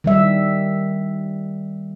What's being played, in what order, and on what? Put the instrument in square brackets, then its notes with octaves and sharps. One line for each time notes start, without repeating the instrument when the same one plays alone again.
[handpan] D#3 G3 E5